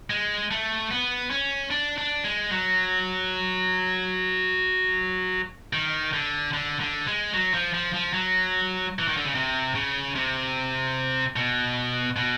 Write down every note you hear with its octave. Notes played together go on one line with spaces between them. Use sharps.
G#3
A3
B3
C#4
D4
D4
G#3
F#3
D#3
D3
D3
D3
G#3
F#3
F3
F3
F3
F#3
E3
D#3
D3
C#3
C3
C#3
C3
B2
B2